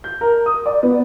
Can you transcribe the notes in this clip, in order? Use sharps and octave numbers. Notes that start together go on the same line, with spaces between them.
G6
A#4
D#6
D5
B3